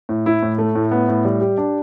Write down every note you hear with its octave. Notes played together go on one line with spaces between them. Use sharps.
A2
E4
A2
A3
A2
B3
A2
G3
G4
D4